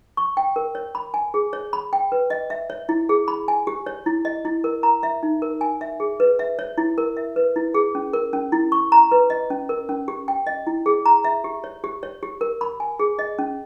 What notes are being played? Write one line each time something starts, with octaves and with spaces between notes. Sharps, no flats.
C#6
G5
A#4
C#5
B5
G#5
G#4
C#5
B5
G5
B4
D#5
E5
C#5
E4
G#4
B5
G#5
G4
C#5
E4
D#5
E4
A#4
A#5
E5
D#4
A#4
G#5
E5
G#4
B4
E5
C#5
E4
A#4
E5
B4
E4
G#4
C#4
A#4
C#4
E4
C#6
A#5
B4
D#5
C#4
A#4
C#4
G4
G5
D#5
E4
G#4
A#5
E5
G4
C#5
G4
C#5
G4
A#4
B5
G#5
G#4
D#5
C#4